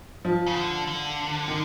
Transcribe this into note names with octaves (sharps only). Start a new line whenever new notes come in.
F3
C#3
D3
D3
D#3